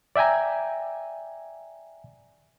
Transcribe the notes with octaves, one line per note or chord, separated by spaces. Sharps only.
D5 E5 G5 G#5 A#5